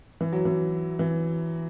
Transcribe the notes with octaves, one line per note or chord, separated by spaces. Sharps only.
E3
F#3
E3
E3